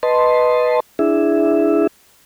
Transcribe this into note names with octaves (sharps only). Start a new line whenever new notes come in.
B4 D#5 A5 C6
D4 E4 G#4 E5